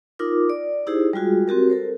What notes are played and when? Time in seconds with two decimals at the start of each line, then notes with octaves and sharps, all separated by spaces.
0.19 D#4 F4 A#4 D6
0.50 D5
0.87 D#4 E4 G4 G#4 C5
1.13 G3 G#3 F4 F#4 G#4
1.48 C4 F#4 G4 A#4
1.70 A4 A#4 C5